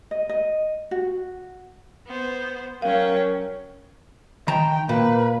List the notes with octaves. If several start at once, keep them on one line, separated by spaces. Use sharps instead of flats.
D#5
D#5
F#4
B3 C5
F#3 C#4 A#4 F5 G5
D#3 G5 A5 A#5
A#2 A#3 B4